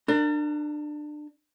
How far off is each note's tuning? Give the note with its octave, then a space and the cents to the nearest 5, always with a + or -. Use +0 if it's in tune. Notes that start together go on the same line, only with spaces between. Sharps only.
D4 +25 A#4 -30